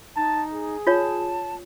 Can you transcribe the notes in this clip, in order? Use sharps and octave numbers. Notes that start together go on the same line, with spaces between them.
D#4 A5
G#4
F4 C#5 A5